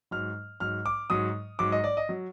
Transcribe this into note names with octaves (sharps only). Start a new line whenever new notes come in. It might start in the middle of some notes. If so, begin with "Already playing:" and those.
G#2 F#3 F6
G#2 F#3 F6
D6
G#2 F#3 D#6
G#2 F#3 D6
D#5
D5
D#5
F#3